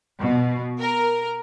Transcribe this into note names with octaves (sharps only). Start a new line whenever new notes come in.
B2
A#4